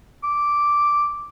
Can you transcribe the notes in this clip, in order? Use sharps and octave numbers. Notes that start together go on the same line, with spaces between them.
D6